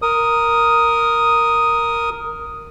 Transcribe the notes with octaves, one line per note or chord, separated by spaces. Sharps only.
A#4 D#6